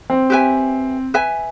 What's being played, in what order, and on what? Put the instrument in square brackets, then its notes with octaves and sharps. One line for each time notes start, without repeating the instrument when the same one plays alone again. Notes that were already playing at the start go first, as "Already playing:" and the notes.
[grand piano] C4
[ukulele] G4 B4 E5 G#5
B4 E5 G#5